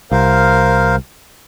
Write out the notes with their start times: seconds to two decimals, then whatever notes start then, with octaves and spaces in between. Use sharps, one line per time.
0.12 C2 A#4 C5 F5